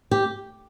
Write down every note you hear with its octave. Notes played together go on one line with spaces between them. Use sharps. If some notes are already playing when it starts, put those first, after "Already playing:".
G4